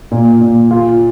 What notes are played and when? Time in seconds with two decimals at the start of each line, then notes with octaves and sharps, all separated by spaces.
0.11 A#2
0.41 A#2
0.71 F4